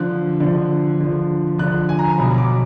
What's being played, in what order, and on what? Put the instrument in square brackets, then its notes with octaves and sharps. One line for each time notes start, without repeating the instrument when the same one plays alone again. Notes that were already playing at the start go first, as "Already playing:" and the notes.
Already playing: [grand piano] D3 F3 F#6
D3 F3
D3 F3
D3 F3 F#6
G#5
A#5
B2 F#3 B5
D6